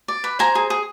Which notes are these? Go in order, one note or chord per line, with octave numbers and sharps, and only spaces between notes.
D5
B4
C5 G#5 A#5
G#4
G#4